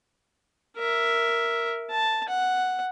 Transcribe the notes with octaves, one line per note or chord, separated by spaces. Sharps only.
A#4 E5
A5
F#5